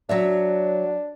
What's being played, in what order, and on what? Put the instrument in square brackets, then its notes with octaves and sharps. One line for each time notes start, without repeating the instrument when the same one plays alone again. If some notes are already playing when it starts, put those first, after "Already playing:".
[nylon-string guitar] F#3 C#5 E5 [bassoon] D4